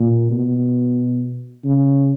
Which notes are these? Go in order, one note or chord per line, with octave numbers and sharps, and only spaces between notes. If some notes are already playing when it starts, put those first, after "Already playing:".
Already playing: A#2
B2
C#3